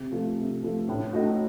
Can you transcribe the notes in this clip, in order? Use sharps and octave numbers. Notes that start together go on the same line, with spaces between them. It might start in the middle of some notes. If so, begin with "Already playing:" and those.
Already playing: C3
F3 A3
C3
F3 A3
A2
A3 D#4 F#4